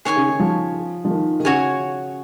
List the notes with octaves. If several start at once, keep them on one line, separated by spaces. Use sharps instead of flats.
D#3 G#4 C#5 G#5 C#6
C#3
D#3
F3
F3
D#3
D#3
C#3 F#4 C#5 G#5